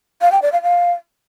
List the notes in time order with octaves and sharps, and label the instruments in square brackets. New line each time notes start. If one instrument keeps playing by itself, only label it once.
[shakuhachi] F5
G5
D5
F5
F5